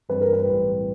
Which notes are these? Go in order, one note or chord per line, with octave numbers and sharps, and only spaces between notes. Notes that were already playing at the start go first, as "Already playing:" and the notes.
G2 E3 G3 C4 B4
A#4
B4
B1 A2 E3 G3 C4